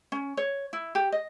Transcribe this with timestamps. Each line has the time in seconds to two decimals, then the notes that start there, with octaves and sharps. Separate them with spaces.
0.12 C#4
0.37 C#5
0.73 E4
0.95 G4
1.12 D#5